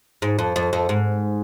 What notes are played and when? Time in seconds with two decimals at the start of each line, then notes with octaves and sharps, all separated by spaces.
0.22 G#2
0.39 F2
0.56 F2
0.73 F2
0.89 G#2